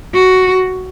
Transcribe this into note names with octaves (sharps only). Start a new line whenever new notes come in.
F#4